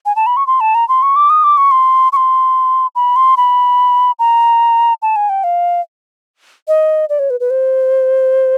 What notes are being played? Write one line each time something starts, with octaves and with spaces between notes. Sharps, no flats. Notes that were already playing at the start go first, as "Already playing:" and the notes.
G#5
A5
B5
C#6
C6
A5
A#5
C6
C#6
D6
D#6
D6
C#6
C6
C#6
C6
B5
C6
B5
A#5
A5
G#5
G5
F5
D#5
D5
C#5
B4
B4
C5